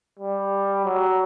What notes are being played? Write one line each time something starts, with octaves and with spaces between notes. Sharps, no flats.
G3
F#3